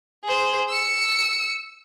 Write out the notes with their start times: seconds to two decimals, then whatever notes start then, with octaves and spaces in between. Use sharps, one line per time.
0.24 G#4 C5
0.69 E6 C#7